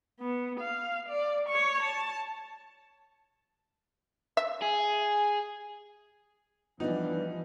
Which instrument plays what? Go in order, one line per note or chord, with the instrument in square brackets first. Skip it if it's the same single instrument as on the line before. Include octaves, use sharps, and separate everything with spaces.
[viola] B3
F5
D5
C#5 C#6
A5
[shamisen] E5
[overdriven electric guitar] G#4
[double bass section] E3 F3 G3 [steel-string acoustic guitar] B3 D4 [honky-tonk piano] D#4